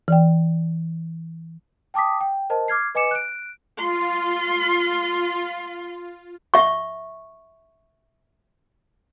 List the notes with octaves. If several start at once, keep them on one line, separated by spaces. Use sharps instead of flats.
E3 D5 G5
G5 A5 D6 D#6 B6
G5
A#4 C5 D#5 A5
D6 F6 G#6 C7
B4 D#5 G#5 D6 C#7 E7
F#6 D7
F4 C6
E5 C#6